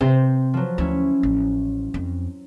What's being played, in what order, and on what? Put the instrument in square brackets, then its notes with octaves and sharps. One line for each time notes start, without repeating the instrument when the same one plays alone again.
[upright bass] C3 [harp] C5
[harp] F3 F#3
[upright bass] D2 [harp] C#4 E4
[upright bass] A1
F2